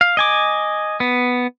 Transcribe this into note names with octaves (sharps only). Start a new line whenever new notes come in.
F5
D#5 G#5 D6
B3